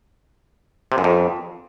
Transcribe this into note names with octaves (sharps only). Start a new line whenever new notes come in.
C3
F#2
F2